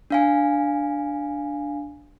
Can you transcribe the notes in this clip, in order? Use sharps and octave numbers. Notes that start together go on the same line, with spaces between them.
D4 F5 G#5